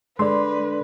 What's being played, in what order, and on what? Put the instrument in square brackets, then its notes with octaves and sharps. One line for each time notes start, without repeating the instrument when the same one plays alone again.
[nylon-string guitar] D3 [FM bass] G#3 [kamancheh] B4 [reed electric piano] D5 C6